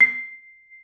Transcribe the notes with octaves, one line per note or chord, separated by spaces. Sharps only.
C7